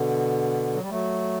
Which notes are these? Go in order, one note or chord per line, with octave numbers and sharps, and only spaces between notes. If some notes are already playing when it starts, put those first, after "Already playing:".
Already playing: B2 D3
F#3
G3
F#3 A3